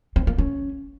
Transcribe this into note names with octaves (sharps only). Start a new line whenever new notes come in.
C4
A#3
C#4